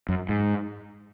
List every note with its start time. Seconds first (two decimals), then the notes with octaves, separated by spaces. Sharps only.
0.09 F#2
0.29 G#2